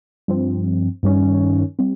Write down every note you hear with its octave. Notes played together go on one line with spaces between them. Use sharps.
G2 F3 C4
G2 D#3 G3 C#4
G3 C4